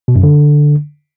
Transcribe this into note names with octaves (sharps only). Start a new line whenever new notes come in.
B2
F#2
D3